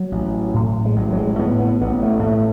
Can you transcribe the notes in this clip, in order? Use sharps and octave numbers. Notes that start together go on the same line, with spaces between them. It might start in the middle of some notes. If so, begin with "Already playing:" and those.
Already playing: F#3
A1
A2
G#3
A1 F#3
F#3
G#3
A2 B3
B3
A1 B3
A3
A2 A3